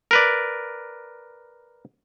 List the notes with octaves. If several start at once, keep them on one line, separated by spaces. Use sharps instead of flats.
A#4 B4 D5